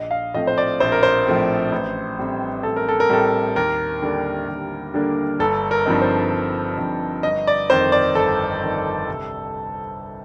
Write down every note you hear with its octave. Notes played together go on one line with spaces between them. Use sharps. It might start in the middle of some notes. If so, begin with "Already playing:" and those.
Already playing: A#1 D#5
F5
A2 F3 A3 C4 D#5
C5
D5
A#1 C5
A#4
C5
A2 F3 A3 C4
A1
A2 G3 C4
A1 A4
A#4
A4
A#4
A2 G3 C4 A4
D#2 A#4
D3 G3 A#3 D4
D#2
D3 G3 A#3 D4
G1 A4
A#4
G2 F3 C4 D#4
C5
G1
G2 F3 C4 D#4
G1 D#5
D5
F2 D#3 C5
D5
G1 A4
F2 D#3
C2